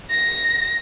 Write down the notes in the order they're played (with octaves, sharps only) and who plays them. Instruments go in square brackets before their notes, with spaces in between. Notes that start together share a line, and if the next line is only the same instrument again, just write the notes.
[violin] A#6